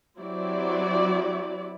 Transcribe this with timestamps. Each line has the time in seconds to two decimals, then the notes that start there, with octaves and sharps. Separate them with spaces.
0.19 F#3 C4 E4 G4 D5